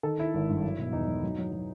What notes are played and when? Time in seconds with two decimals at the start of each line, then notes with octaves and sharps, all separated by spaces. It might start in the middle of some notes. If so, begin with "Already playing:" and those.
0.03 D#3 A4
0.18 D#3 E4
0.34 G#1
0.49 G2
0.64 F#3
0.78 B2
0.93 E2 D#4
1.08 F#3
1.24 F#3
1.38 F#3
1.53 F#3